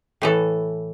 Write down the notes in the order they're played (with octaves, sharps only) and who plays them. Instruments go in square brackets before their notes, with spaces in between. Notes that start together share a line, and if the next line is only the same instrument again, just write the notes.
[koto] A2 E3 A4